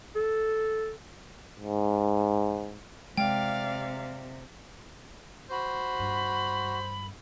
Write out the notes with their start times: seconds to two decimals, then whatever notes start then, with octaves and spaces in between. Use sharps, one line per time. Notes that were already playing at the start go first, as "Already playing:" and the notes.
0.15 A4
1.60 G#2
3.17 C3 G#3 D5 F5 G5
5.51 F#4 C5 B5
5.99 G2